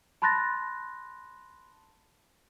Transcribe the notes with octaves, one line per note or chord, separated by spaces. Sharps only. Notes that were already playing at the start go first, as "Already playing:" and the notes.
A5 B5 C6 F#6 A6 A#6